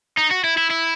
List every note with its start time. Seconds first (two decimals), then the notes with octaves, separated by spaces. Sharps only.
0.18 D#4
0.31 F#4
0.44 E4
0.57 E4
0.70 E4